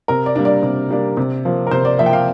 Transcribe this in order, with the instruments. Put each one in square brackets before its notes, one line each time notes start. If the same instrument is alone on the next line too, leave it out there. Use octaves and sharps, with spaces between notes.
[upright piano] C3 A#4
D5
G3 A#3 D4
D5
C3
G3 A#3 D4
C3
F3 A#3
A#4
C3 C5
D5
F3 A#3 E5
G5
F5